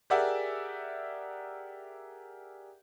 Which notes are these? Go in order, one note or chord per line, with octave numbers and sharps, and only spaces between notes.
G4 G#4 A#4 D5 E5 F#5